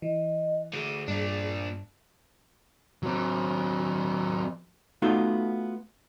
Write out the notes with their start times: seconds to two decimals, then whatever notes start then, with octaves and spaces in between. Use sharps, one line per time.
0.02 E3 D#5
0.74 D2 D3 G#4
1.08 G2 A#2 D4
3.03 F#3 C4
5.02 A3 B3 D#4 F4 F#4 A4